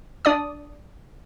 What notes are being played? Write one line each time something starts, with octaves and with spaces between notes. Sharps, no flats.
D4 D5 D#6